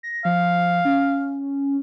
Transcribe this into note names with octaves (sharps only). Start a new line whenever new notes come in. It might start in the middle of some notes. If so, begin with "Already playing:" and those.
A#6
F3 F5
C#4